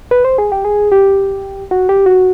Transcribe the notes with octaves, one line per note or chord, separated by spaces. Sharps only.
B4
C5
G#4
G4
G#4
G4
F#4
G4
F#4